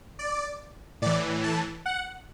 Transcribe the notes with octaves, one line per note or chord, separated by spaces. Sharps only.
D5
A2 E3 D5
A5
F#5